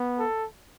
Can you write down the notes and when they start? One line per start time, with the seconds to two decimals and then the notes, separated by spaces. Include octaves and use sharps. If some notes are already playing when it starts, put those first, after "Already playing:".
Already playing: B3
0.19 A4